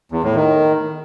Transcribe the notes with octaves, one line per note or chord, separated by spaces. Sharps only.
E2
A2
D#3